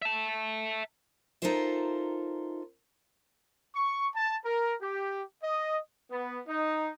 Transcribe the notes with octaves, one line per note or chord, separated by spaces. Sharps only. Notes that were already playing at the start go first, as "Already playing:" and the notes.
E5 A5
D#4 F4 A4 A#4 C5 E5
C#6
A5
A#4
G4
D#5
B3
D#4